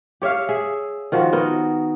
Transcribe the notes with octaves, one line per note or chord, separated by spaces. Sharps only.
G4 C#5 E5 F5
G#4 E5
D#3 F3 F#4
B3 D#4 F#4 A#4